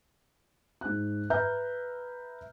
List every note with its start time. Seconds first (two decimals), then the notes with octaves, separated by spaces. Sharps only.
0.81 G#2 F#6
1.30 B4 E5 A#5 F6 G6